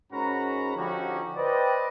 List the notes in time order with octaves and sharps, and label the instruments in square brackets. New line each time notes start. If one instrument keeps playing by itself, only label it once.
[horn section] G#2 C#4 F#4 A#4 A#5 B5
D3 F3 C#4 D#4 F#4 G4
B4 C5 D5 D#5 G5